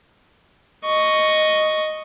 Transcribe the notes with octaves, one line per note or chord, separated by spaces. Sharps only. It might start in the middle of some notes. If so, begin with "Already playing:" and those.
D#5 C#6